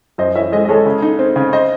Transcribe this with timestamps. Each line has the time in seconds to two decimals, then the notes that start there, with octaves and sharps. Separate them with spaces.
0.18 F#2 C5 D#5
0.35 E3 C#5 E5
0.52 G#3 C5 D#5
0.65 D#5
0.69 G#3 A4 C#5
0.86 C#3
1.02 D#4
1.19 C4
1.36 C#3
1.53 C5 D#5